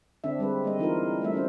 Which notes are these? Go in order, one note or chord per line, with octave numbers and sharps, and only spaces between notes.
D3 C4 D4 E5
G3 G#3 C4 B4
G3 A#3 D#5
E3 D#4 F4 A#4
G3 A3 E5
C#4 D4 C5